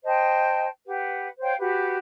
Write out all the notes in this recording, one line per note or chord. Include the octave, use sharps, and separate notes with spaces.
C5 D#5 G5 A5
G4 B4 F#5
C5 C#5 F5 G5
F#4 G4 B4